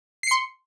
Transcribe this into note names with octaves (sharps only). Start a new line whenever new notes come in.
C6 C7 C#7